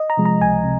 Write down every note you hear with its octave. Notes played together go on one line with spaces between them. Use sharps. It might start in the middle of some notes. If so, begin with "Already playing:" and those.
Already playing: D#5
A#5
C3 F3 G#3
A#5
C#2 G#5
C3